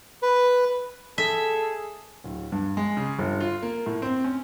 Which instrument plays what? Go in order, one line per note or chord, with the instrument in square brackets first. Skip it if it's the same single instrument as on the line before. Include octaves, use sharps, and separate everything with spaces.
[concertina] B4
[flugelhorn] G#4 [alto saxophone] A4 [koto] E5
[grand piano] D1
G2
G#3
C#3
G1
F4
A#3
A2
C4
C#4